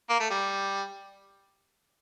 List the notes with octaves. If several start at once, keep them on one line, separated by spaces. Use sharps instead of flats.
A#3
A3
G3